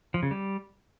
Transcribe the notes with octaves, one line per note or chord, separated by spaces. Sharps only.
F3
C#3
G3